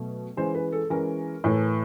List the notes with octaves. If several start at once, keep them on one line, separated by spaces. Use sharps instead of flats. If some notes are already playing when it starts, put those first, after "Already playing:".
Already playing: B2 F#3 A3
E3 G#3 C#4 C5
B4
A4
E3 G#3 C#4 A#4
A2 E3 A3